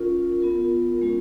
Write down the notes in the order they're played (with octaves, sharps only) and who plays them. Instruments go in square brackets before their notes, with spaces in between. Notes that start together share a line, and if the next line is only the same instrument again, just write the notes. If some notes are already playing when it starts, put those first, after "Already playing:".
Already playing: [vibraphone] C#4 F4 A#4
B3 F4 A#4
G#3 C#4 F4